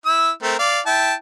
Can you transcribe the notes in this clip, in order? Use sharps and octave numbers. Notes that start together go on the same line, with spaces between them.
E4 E6
A3 C4 A#4
D5 F5
E4 G5 A5